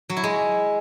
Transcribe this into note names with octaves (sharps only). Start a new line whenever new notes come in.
F#3
E4
G#3